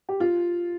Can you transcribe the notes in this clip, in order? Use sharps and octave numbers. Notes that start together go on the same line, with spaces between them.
G4
F4